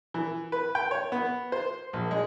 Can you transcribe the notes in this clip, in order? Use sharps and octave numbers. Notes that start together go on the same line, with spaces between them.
E3
B4
G5
C#5
B3
C5
A#1
G#3